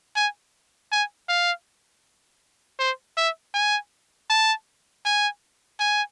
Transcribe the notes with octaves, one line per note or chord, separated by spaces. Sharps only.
G#5
G#5
F5
C5
E5
G#5
A5
G#5
G#5